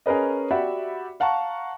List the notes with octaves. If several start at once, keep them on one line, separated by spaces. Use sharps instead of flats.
C#4 G#4 A#4 B4 D#5
F#4 G4 D5 E5 F#5 B5
F5 F#5 A5 A#5 C#6